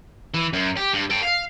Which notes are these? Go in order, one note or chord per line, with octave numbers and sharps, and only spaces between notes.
E3
F#2
G4
G2
A4 G5
F5